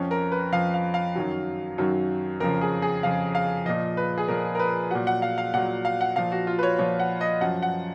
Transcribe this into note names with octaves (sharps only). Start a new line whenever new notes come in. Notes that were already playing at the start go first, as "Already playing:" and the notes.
Already playing: F2 F3 C#4
A#4
B4
F2 F3 F5
F5
F5
F#2 D#3 F#3
F#2 D#3 F#3
F2 C#3 F3 A#4
G#4
G#4
F2 C#3 F3 F5
F5
A#2 F3 D#5
B4
G#4
A#2 F3 A#4
A#4
B4
A#2 F#3 F#5
F#5
F5
F5
A#2 F#3 F#5
F5
F#5
A#2 F3 F5
F#4
F4
B4
C#5
A#2 F3 C#5
F#5
D#5
F#2 F3 F#5
F#5